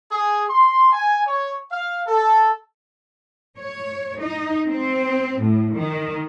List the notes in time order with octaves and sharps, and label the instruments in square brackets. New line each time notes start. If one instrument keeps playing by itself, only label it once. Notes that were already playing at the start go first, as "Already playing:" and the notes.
[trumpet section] G#4
C6
G#5
C#5
F5
A4
[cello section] C#5
D#4
C4
A2
D#3